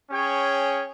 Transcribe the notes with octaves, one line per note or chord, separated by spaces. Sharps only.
C#4 G#4 C#5 G5